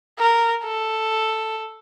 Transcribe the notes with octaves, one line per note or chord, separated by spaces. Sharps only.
A#4
A4